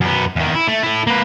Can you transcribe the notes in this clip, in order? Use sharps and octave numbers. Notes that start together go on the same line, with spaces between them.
F#2 B3
E2 D#3
E4
A3
E4 A4
A#3 B4